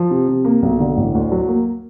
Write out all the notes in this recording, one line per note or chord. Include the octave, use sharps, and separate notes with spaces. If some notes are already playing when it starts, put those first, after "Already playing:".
Already playing: F3
C3
C3
A#3
B1
D3
A1
D2
F#3
A#3